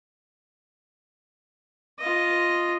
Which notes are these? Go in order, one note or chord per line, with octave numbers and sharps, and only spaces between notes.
F4 D#5